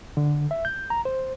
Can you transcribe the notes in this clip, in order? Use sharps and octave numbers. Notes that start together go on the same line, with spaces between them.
D3
E5
G6
A#5
C5